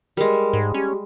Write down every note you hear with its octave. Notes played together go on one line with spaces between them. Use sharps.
G3 G#3 A#4
G#2
C#4 G4